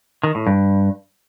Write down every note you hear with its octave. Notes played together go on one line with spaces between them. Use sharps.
D#3
A2
G2